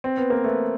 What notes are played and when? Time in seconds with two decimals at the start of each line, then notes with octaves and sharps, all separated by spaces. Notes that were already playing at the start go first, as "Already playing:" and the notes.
0.04 C4
0.17 B3
0.30 A#3
0.44 A3 B3